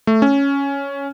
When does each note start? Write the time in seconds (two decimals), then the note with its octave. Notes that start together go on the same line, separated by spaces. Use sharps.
0.07 A3
0.22 C#4